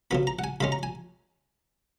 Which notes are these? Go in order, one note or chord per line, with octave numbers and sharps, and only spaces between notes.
C#3 F#3 B3 B5
A#5
F#5
G#5
C#3 G#3 C#4 B5
A#5
G#5